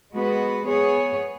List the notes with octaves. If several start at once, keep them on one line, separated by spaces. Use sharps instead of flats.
G#3 B3 F#4 B4
B3 G#4 C#5